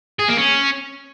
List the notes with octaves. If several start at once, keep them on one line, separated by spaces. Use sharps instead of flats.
G#4
A#3
C#4